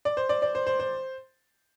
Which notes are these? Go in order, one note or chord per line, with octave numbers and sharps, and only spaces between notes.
D5
C5
D5
D5
C5
C5
C5